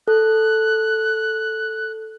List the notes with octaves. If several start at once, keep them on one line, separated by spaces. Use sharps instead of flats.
A4 F#6